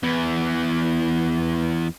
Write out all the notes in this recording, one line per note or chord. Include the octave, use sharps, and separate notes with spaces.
E2 E3